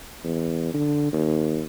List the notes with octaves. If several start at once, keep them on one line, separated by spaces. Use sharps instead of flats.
E2
D3
D#2